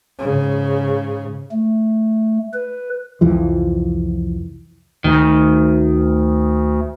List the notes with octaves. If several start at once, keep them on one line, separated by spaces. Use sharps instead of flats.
G#2 C#3
A3
B4
C2 F2 E3 F3
D2 D#3